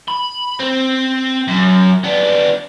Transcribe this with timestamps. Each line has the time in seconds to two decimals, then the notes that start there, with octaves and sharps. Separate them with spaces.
0.08 B5
0.60 C4
1.48 F#2
2.04 B3 D4